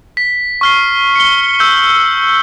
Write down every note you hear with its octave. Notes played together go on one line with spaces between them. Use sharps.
B6
C#6 F6 C7
C#7 G7
E6 G6